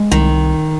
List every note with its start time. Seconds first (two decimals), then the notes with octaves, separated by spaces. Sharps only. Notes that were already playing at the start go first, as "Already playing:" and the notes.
Already playing: G#3
0.12 C2 D#3